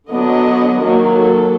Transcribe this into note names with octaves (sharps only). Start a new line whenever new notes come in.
D3 F#3 B3 D4 D#5
D#3 F#3 A#3
A4